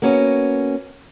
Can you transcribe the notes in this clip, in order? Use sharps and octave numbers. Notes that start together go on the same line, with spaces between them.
A#3 B3 C#4 F#4